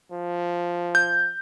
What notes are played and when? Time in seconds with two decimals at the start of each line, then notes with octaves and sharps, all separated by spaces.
0.12 F3
0.95 G6